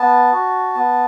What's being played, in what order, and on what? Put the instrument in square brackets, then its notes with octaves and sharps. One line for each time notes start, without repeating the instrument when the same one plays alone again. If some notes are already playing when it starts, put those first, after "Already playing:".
Already playing: [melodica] B3 A5
F#4
B3